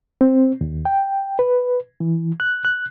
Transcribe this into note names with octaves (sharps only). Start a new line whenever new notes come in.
C4
D#2
G5
B4
E3
F#6
F#6